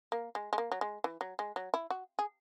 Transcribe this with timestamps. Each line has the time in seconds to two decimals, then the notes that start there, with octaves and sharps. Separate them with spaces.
0.12 A#3
0.35 G#3
0.53 G#3
0.58 A#3
0.72 F#3
0.81 G#3
1.04 E3
1.21 F#3
1.39 G#3
1.56 F#3
1.74 E4
1.90 F#4
2.19 G#4